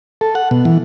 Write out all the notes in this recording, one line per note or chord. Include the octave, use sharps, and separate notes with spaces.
A4
F#5
B2
E3